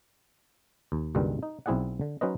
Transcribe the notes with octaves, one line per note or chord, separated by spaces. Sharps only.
D#2
C#2 G2 B2 D#3 G3 G#3
D#4
B1 C4 E4 G#4 D5 F#5
D3
F#3 C#4 D#4 B4 C5 D#5